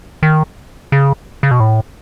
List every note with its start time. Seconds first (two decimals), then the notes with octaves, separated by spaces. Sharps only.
0.23 D#3
0.92 C#3
1.43 C#3
1.51 B2
1.60 A2